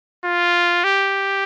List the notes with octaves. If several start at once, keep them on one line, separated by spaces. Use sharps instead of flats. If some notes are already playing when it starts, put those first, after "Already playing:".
F4
G4